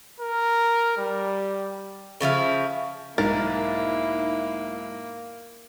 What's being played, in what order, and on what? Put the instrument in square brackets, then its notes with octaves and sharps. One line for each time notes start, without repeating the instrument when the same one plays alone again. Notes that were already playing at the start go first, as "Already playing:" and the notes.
[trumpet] A#4
G3
[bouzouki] C#3 F3 E4 F5
[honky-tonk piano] B1 G#2 A6 [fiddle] A#3 [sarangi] E4 [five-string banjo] A#4